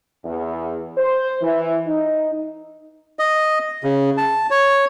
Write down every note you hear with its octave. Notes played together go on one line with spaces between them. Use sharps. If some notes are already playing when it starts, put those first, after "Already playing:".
E2
C5
E3
D#4
D#5
C#3
A5
C#5